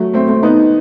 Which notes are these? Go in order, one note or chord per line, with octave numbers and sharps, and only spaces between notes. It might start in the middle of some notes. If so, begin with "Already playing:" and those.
Already playing: F#3 A3
A3 C4
A3 C4
B3 D#4